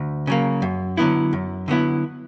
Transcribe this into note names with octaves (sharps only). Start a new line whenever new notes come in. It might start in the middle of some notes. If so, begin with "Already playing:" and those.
Already playing: D2
C#3 F#3 A#3
F#2
D3 F#3 B3 E4
F#2
D3 F#3 B3 E4